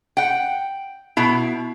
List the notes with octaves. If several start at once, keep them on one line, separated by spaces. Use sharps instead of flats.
F#5 G5
B2 E4